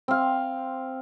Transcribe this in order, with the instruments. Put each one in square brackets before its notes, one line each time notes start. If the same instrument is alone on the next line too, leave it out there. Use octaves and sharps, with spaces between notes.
[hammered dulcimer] C4 F5